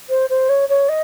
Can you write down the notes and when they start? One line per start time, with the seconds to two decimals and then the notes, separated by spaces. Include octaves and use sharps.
0.09 C5
0.29 C5
0.49 C#5
0.69 C#5
0.88 D#5